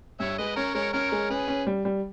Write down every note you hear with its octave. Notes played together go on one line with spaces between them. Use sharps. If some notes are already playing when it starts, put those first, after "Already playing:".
G2 C#5 E5
G#3 B4 D#5
C#4 A#4 C#5
G#3 A#4 C#5
C#4 A#4 C#5
G#3
C#4 G#4 B4
C#4
G3
G3